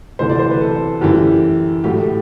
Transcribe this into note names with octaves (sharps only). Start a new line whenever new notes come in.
D2 C3 E3 A3 C5
D5
C5
B4
A4
F#2 E3 A3 G4
A2 F#3 A3 G4